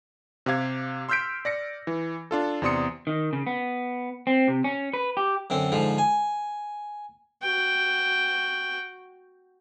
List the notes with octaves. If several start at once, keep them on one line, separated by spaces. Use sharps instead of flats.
C3 G4 F5 G#6
C6 E6 F6 G6 B6 D7
D5 A#6 C#7
E3
D4 F4 A4
E2 C3 D5 C6 D#6 C#7
D#3
C#3
B3
C4
C3
C#4
B4
G4
F#2 D3 C4
G#2 D3 F3
G#5
F#4 G5